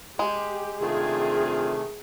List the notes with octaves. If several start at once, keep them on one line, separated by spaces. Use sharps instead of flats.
G#3 G4
C3 D#3 A3 C4 D4 F4 G#4